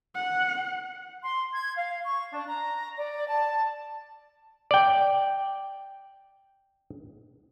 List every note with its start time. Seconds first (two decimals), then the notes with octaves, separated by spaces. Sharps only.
0.15 F#5
1.24 C6
1.53 G#6
1.76 F5
2.04 C#6
2.32 D4
2.48 A#5
2.98 D5
3.28 A5
4.71 D5 G5